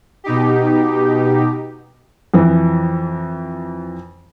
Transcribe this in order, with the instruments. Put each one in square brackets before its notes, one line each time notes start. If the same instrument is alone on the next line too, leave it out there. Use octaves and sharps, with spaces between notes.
[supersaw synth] B2 D#4 G4
[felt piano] F2 E3